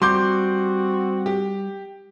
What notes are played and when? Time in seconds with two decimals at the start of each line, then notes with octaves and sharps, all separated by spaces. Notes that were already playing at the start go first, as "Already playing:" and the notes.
0.02 G3 C4 F#4 C6 D6 G6
1.26 G4